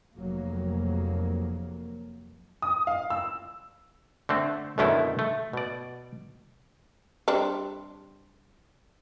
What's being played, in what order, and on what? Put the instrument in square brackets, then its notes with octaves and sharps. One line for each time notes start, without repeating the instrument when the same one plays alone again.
[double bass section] F1 F2 F#3 A#3
[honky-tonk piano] D#6
F5
E6
[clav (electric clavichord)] D3 A3 C4
F#2 B2 D3 D#3 A3 E4
A3
B2 D5
[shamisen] G3 C4 D4